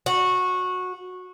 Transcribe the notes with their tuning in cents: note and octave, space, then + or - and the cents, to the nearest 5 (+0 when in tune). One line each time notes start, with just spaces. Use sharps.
F#4 -15